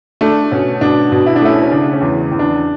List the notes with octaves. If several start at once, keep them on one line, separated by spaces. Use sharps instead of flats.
A3 D4
B2 C#4
B2 D4
B2
E4
D4
A3 C#4 E4
C#4
C#3 D4
C#4
E2
E2
D4